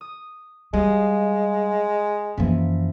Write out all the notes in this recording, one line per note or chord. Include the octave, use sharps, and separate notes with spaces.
D#6
G3 G#3 D#5 F5 D#6
F#2 E3 F3 A#3 B6